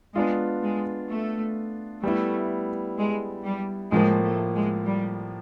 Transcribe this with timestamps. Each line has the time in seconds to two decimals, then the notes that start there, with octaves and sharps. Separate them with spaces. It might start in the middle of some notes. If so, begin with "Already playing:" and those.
0.15 G#3 B3 D4 F4
0.62 G#3
1.10 A3
2.03 G3 A3 B3 E4
2.97 G#3
3.44 G3
3.91 A2 F3 G#3 A#3
4.23 A3
4.54 G#3
4.86 G3